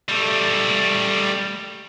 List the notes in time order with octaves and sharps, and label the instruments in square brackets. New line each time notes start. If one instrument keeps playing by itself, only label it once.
[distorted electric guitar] G3 A3